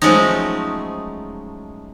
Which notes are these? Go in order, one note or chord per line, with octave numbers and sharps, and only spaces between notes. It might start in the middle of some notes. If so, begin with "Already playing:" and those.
F3 F#3 G#3 A3 C#4 D#4